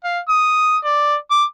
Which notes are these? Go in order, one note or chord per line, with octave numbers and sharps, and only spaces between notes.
F5
D#6
D5
D6